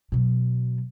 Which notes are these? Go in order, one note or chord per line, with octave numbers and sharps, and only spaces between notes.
B2 F#3